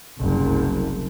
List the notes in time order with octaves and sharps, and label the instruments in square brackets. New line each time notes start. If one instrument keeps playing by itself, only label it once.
[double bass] F#1 C2